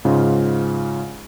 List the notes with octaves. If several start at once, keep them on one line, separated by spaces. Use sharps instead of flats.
G#2 C#3 F4